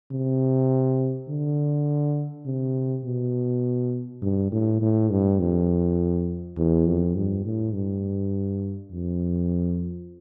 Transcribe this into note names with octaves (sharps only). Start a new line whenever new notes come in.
C3
D3
C3
B2
G2
A2
A2
G2
F2
E2
F2
G2
A2
G2
F2